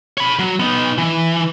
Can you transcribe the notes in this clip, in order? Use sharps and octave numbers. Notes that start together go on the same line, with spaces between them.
C#5 B5
F#3
B3 D#4
E3